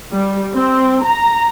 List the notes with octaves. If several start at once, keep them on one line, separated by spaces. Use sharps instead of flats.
G3
C4
A#5